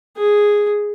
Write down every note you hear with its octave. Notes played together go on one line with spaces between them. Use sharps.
G#4